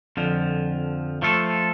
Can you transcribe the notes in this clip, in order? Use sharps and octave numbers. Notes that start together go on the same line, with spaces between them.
F2 D3 F3
F3 A3 F4 A4